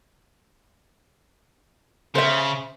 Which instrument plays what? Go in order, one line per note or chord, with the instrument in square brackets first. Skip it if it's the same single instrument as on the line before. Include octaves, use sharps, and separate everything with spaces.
[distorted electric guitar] C#3 [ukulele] C5 E5